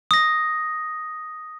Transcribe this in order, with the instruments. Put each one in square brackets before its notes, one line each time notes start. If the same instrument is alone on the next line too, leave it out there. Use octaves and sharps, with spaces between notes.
[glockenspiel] D#6 A#6